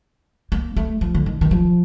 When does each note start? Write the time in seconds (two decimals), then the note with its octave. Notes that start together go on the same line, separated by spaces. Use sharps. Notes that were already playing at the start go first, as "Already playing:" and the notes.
0.52 A#3
0.76 A3
1.01 F3
1.15 D3
1.26 D#3
1.41 D#3
1.51 F3